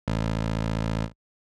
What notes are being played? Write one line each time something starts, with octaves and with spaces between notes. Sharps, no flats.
A1